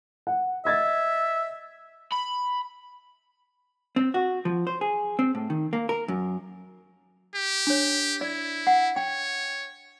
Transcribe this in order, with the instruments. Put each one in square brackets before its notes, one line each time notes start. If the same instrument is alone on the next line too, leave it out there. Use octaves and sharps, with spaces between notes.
[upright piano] F#5
[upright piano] D#5 G#6 A6 [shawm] E5
[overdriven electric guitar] B5
[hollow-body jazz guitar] C4
F#4
F3
C5
G#4
C4
A2
D#3
A#3
A#4
F#2
[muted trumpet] G4
[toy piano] D4 C#5
[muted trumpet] E4 [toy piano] D5
[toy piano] F#5
[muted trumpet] C#5 [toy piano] G5